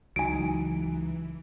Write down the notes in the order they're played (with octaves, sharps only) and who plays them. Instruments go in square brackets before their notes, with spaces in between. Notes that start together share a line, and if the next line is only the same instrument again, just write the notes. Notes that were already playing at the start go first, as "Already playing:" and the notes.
[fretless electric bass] C#2 [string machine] E3 [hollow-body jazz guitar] F#3 D#4 [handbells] G#5 D7